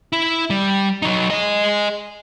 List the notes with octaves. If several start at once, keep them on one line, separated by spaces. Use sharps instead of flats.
E4
G3
F#3 D#4
G#4 D#5